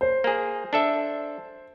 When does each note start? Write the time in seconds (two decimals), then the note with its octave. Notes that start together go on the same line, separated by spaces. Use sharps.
0.01 C5
0.24 A#3 G#4
0.73 D4 A4 E5